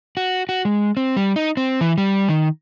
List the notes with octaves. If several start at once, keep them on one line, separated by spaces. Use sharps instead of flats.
F#4
F#4
G#3
C4
G3
D#4
C4
E3
G3
D#3